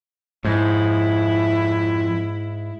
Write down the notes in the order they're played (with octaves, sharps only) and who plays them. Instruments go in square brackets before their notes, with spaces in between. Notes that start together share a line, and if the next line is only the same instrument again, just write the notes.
[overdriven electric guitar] F2 [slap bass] G#2 [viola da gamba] E4